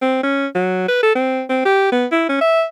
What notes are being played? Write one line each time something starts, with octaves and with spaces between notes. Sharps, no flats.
C4
C#4
F#3
B4
A4
C4
C4
G4
B3
E4
C#4
E5